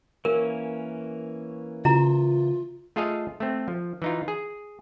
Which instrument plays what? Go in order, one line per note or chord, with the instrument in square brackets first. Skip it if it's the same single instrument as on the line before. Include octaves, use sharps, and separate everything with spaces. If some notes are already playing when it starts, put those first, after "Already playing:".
[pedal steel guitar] E3 A#3 C#4 [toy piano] A#4
[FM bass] C#3 [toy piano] E4 A#5 [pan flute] F4
[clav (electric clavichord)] A3 F4 G#4 A4 D#5 F5
A3 C4
F3
E3 D#4 F4
G#4